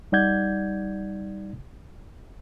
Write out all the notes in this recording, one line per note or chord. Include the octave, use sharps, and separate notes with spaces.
G3 D#4 D5 F#5 G6 G#6